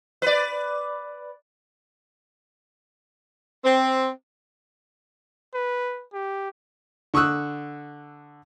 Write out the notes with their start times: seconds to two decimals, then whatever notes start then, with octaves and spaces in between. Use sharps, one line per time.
0.22 B4 D5
3.65 C4
5.54 B4
6.13 G4
7.14 D3 C#6 D#6 E6 F#6